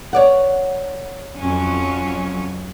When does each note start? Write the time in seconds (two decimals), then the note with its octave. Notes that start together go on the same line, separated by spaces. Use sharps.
0.13 C#5 D5 F#5
1.40 F2 F#3 C#4